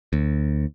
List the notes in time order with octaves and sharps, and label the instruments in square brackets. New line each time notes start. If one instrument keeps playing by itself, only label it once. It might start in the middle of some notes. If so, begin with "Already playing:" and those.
[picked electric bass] D2